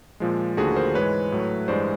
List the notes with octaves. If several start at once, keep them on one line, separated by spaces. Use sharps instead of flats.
A#2 F3 G#3
D#2 D3 F3 A3 F#4 G#4
A#4 C5
G#2 E3 G#3 B4 C#5
A2 F#3 A3
G2 E3 G#3 C5 D5